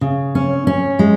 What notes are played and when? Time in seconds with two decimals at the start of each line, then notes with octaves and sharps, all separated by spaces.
0.01 C#3
0.35 C#4
0.67 C#4
0.99 G#3